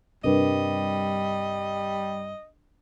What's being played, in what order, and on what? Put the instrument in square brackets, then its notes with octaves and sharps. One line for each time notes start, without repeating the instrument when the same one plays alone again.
[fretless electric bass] G2 C3 [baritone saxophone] G3 [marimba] D4 A#4 B4 [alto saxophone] D#5